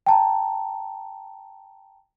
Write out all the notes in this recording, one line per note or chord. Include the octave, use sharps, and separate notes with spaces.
G5 A5 A#5